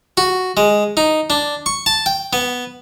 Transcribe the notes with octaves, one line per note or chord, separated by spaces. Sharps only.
F#4
G#3
D#4
D4
C#6
A5
G5
B3